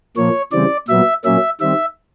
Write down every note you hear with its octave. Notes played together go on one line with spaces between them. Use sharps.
A#2 F3 A#3 C#5
C#3 E3 G3 C4 D5
A#2 F#3 B3 E5
A#2 F#3 A#3 C#4 E5
D#3 G3 C4 E5